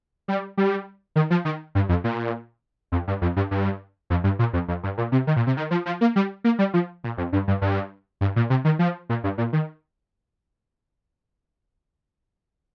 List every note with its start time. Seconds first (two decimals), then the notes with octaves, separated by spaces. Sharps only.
0.28 G3
0.57 G3
1.16 D#3
1.30 F3
1.45 D#3
1.75 G2
1.89 F2
2.04 A#2
2.92 F2
3.07 G2
3.22 F2
3.36 G2
3.51 G2
4.10 F2
4.24 G2
4.39 A#2
4.53 F2
4.68 F2
4.83 G2
4.98 A#2
5.12 C3
5.27 D#3
5.36 A#2
5.47 C3
5.57 D#3
5.71 F3
5.86 F3
6.01 A#3
6.16 G3
6.44 A#3
6.59 G3
6.74 F3
7.04 A#2
7.17 F2
7.32 G2
7.48 G2
7.62 G2
8.21 G2
8.36 A#2
8.50 C3
8.65 D#3
8.79 F3
9.09 A#2
9.24 G2
9.38 A#2
9.53 D#3